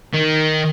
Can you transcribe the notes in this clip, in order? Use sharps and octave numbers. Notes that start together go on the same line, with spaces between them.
D#3